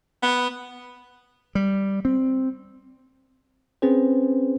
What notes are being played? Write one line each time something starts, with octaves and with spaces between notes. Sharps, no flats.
B3
G3
C4
C4 C#4 G#4 B4 C5